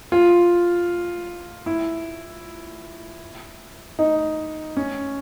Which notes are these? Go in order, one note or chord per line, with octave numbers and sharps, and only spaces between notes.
F4
E4
D#4
C#4